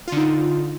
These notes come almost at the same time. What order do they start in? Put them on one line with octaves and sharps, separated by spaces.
F4 D3 D#4